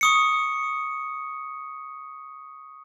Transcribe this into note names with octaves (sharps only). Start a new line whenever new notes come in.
C#6 D#6 C#7